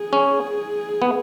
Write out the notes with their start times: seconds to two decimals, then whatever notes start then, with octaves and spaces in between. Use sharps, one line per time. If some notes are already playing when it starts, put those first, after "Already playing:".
Already playing: G#4
0.13 C#4
1.02 B3